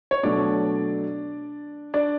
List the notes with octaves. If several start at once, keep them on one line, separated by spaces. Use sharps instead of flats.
C#5
B2 F#3 A3 D4 D5
D4 D5